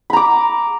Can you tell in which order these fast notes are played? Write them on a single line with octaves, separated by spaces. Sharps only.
B5 A#5 D6